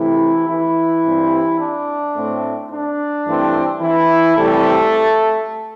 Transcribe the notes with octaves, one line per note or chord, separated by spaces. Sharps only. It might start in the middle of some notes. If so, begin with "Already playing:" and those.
Already playing: C3 E3 A3 C4 E4
E3 E4
G2 G3 C4
D4
A2 A3 C4
D4
G2 E3 A3 C4
E3 E4
C3 E3 G3 A3 C4 A4